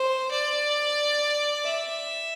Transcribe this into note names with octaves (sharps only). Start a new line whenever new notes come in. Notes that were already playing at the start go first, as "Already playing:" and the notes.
Already playing: C5
D5
E5